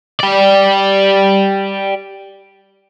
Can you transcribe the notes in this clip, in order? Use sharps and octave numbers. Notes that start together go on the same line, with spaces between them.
G4 D5